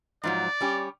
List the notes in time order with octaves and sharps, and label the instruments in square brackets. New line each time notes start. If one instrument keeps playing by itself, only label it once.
[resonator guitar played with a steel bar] G#2 F3 F#3 [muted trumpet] D5
[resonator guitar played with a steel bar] G3 C#4 G4